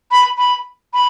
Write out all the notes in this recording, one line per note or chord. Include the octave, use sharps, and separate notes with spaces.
B5
B5
B5